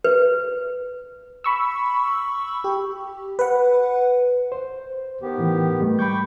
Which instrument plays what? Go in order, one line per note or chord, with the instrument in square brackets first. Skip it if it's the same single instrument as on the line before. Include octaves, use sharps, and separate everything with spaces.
[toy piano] B4
[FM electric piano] B5 C#6 E6
G4
B4 F#5
[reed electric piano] C5
[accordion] D#3 B3 G4
[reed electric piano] A2 E3
G#2 G3 A3
[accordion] G5 C#6 D6 [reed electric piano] B5 G6